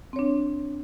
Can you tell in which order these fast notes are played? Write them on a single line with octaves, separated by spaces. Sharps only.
C4 C#5 D4